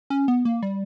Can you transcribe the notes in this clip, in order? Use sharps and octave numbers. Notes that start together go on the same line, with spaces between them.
C#4
B3
A#3
G3